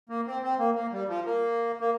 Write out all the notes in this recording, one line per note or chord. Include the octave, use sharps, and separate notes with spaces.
A#3
C4
C4
A#3
A#3
G3
F3
A#3
A#3